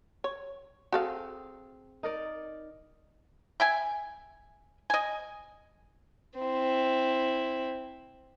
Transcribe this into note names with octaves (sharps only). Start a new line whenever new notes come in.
C#5
C4 F#4 G#4 A4 F5
D#4 A#4 D5
E5 G5 G#5
D#5 G#5
C4 E4